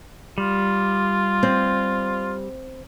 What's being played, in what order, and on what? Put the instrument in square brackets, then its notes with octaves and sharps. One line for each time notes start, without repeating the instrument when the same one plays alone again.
[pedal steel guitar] G3 [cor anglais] F4
[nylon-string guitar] C4